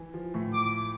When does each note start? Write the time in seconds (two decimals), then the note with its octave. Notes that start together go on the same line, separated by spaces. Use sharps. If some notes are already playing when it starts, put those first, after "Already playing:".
Already playing: E3
0.14 F3
0.34 A2 A3
0.54 D6